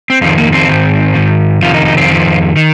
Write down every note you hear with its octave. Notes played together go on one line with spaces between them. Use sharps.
C4
F2 D#3 C4
A#3
C4
G#2 D#3
G#2 D#3
F2 C3 D#3 F4
D#4
D#4
C4
F2 D#3
D#3